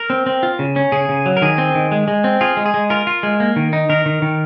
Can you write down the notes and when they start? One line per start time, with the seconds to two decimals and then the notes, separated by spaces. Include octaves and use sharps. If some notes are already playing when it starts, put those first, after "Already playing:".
Already playing: A#4
0.10 C4
0.26 C4
0.43 F4
0.59 C#3
0.76 C#4
0.92 C#3 G#4
1.09 C#3
1.26 F#3
1.37 A#4
1.42 D#3 G#4
1.58 C4
1.75 D#3
1.92 G#3
2.08 G#3
2.24 C4
2.41 F4 G#4
2.57 G#3
2.66 G#4
2.74 G#3
2.90 F4 A#4
3.07 F4
3.23 G#3
3.40 A#3
3.56 D#3
3.73 D#4
3.89 D#3 A#4
4.06 D#3
4.22 D#3